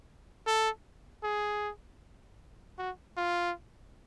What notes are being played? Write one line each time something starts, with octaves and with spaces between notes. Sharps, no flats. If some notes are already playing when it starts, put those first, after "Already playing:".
A4
G#4
F#4
F4